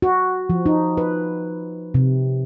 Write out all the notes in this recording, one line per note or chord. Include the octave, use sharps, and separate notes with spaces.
F#4
F3
D#4
B4
C3